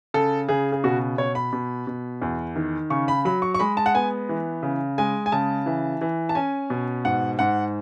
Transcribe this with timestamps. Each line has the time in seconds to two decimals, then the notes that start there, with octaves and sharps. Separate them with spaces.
0.14 C#3 A4
0.49 C#3 G#4
0.72 G#4
0.84 B2 F#4
1.18 B2 C#5
1.35 B5
1.53 B2
1.87 B2
2.22 E2
2.56 D#3
2.90 C#3 C#6
3.08 B5
3.25 F#3 B5
3.42 C#6
3.55 C#6
3.59 G#3 B5
3.77 A5
3.86 F#5
3.94 B3 G#5
4.29 E3
4.63 C#3
4.98 G#3 G#5
5.26 G#5
5.32 C#3 A5
5.66 E3
6.01 E3
6.29 A5
6.35 C#4 G#5
6.70 B2
7.05 G#2 F#5
7.39 G#2 F#5